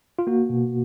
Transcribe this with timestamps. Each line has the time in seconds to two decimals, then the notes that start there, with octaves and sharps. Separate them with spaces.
0.19 F4
0.27 A#3 F#4
0.50 B2